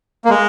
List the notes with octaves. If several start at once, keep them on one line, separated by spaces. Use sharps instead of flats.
A#3
G#3